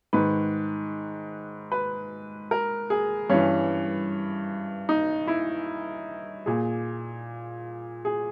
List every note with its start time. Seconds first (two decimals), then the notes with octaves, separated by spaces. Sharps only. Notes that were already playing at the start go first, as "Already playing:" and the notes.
0.13 G#2 D#3 B4
1.72 B4
2.51 A#4
2.90 G#4
3.30 G2 E3 C#4
4.89 D#4
5.28 E4
6.46 A#2 G#4
8.05 G#4